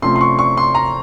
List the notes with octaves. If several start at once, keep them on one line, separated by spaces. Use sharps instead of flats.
C3 F3 A3 C#4 F4 C6
C6
C#6
C#6
C6
A#5